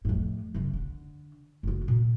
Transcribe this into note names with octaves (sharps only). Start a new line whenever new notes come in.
F2 A2
F#2 C#3
D3
F#1 F4
F#2 A#2